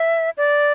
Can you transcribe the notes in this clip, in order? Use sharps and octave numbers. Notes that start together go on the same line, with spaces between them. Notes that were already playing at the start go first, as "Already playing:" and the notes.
Already playing: E5
D5